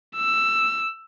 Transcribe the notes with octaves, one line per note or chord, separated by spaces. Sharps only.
E6